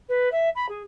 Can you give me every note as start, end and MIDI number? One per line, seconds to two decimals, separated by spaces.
0.09 0.29 71
0.32 0.49 76
0.55 0.66 83
0.69 0.82 68